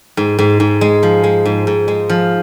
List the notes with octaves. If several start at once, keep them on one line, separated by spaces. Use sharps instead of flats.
G#2
G#2
G#2
G#3
F3
G#3
G#2
G#2
G#3
F3